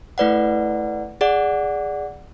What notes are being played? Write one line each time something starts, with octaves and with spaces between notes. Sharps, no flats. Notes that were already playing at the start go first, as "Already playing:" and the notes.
A3 E4 B4 D5 F#5
G#4 D5 F#5